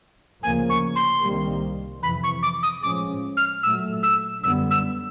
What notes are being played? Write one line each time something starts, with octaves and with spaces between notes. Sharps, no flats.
D2 C#3 F3 A#3 G#5
C#6
C6
C2 C3 D#3 G3 A#3
F2 C3 E3 B5
C#6
D6
D#6
A2 F3 G#3 C#4 D6
F6
A#2 F#3 A3 E6
E6
F#2 D3 G3 B3 E6
E6